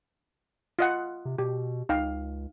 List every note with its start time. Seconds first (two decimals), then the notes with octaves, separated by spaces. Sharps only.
0.79 F4 D#5 F#5
1.25 C3
1.38 B2 G4
1.89 C#2 D#4 F5 G5